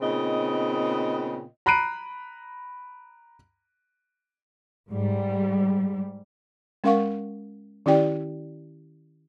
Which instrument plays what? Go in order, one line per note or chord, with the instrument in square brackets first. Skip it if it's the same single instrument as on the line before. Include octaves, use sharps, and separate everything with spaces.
[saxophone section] A#2 C#3 B3 C4 D#4 D#5
[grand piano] A#5 B5 F#6 C7 D7 D#7
[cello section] G#2 G3
[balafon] G#3 C#4 A#4 F5 F#5 C#6
D#3 C#4 E4 G4 D5 G5